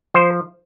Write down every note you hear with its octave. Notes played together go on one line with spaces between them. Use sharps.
F3 C5